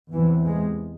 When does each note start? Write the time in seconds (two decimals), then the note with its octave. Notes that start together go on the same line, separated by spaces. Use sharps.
0.11 E2 C3 E3
0.46 G#3